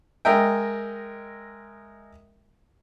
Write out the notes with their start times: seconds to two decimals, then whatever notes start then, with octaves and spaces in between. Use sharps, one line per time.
0.25 G#3 A#4 D#5 E5 G5